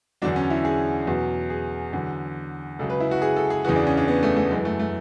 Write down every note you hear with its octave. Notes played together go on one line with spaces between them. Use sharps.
E2 D3 F#3 D4
C#4
E4
G#4
E2 B2 F#3
G#4
E2 D3 F#3
C#2 C#3 F#3 A4
B4
E4
F#4
G#4
A4
G#4
E2 C#3 E3 F#4
D4
C#4
D4
B3
A3
A3
F#2 E3 G#3
A3
A3